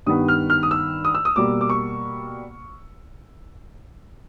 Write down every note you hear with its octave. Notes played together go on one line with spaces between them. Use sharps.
G2 D#3 G3 B3 D#6
F6
F6
D#6
E6
D#6
E6
D#6
B2 G3 A#3 D6
D6
C#6